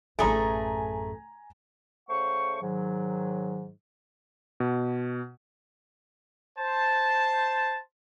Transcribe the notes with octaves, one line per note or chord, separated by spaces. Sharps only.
A1 F#2 A3 G#4 G#5 A#5
C#3 A3 C5 F#5 C#6
G#2 D#3 F#3
B2
C5 A5